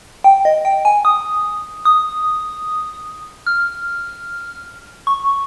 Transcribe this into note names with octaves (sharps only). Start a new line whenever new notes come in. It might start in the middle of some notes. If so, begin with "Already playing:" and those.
G5
D#5
G5
G#5
D#6
D#6
F6
C#6